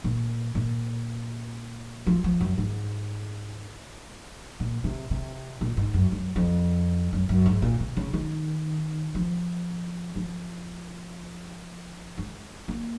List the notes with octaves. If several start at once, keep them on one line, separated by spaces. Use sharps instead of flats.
A#2
A#2
F3
F3
F#2
G#2
A#2
C3
C3
A#2
G#2
F#2
F#2
F2
F#2
F#2
G#2
A#2
C3
C#3
D#3
F3
F3
G#3
A#3